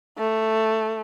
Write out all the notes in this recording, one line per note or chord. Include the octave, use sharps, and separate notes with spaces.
A3